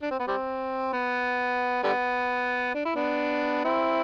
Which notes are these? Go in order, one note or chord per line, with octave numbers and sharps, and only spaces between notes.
D4
C4
B3
G3 C4
B3
D3 G3 B3
D4
E4
B3 D4
C4 E4